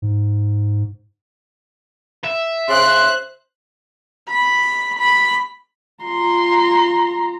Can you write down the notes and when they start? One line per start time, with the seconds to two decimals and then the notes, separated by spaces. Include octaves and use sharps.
0.02 G#2
2.24 E5
2.69 C#3 C5 C6 F#6
4.29 B5
4.99 B5
6.03 F4 A#5 C6